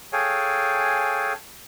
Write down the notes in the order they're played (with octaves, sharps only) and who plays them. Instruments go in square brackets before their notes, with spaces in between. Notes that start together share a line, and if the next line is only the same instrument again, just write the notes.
[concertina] G#4 A4 C#5 F5 G5 G#5